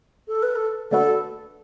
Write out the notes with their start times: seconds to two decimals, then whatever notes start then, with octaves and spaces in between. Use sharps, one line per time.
0.28 A4
0.42 B4
0.55 A4
0.91 D3 A3 D4 F#4 A4 B4